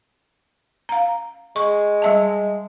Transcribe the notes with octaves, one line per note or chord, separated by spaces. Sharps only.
F5 A#5
G#3 C#6
G3 E5 A5